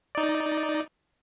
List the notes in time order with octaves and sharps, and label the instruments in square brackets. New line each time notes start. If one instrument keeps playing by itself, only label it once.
[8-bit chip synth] D#4 D5